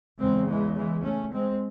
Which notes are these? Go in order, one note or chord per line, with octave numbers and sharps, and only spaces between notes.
E2 C#3 G#3 C4
E3 G#3
E3 G#3
A3 C#4
G#3 C4